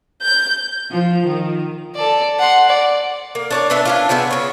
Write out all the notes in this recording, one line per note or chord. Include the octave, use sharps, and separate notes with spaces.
G6
F3
D#3
A4 D5
F#5 C6
D5
A#3
D4 C#5 D5
B3 D4 E5
C#4 D4 F4
B3 E4 G#4 C5
C#3 C#5